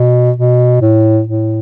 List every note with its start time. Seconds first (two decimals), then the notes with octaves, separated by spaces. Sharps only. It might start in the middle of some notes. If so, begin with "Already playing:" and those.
Already playing: B2
0.36 B2
0.81 A2
1.27 A2